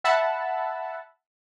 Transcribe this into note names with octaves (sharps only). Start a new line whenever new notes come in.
E5 F#5 A5 B5 E6